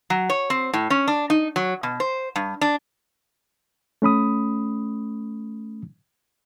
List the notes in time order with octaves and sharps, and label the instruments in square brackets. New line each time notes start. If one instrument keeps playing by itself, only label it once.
[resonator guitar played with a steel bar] F#3
C#5
C4
A2
C#4
D4
D#4
F#3
B2
C5
G2
D4
[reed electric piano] A3 C#4 B5 D#6